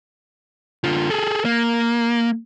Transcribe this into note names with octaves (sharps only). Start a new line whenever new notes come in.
D3 F4
G#4 A4
A#3